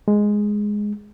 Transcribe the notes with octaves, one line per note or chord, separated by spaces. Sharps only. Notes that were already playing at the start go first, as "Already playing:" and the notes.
G#3